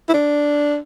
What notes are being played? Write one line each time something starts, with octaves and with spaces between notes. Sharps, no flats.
E4
D4